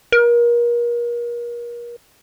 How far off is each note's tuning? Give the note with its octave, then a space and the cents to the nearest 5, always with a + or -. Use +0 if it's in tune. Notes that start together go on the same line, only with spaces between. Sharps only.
A#4 +35